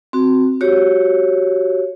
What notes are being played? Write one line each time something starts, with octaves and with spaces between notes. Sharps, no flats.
C4 F#4
F#4 G4 C#5